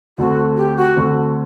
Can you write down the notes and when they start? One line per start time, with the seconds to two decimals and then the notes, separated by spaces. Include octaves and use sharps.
0.18 D2 D3 A3 C4 F#4
0.57 G4
0.77 F#4
0.96 D2 D3 A3 C4